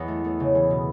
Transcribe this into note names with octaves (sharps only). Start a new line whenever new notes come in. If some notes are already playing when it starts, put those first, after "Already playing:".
Already playing: E2 E3 D#5 F#5
A3
A3
C#3
E3
B2